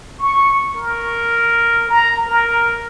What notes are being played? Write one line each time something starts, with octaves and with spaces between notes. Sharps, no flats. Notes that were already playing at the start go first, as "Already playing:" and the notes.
C#6
A#4
A#5
A#4